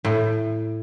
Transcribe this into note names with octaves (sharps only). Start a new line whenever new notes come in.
A2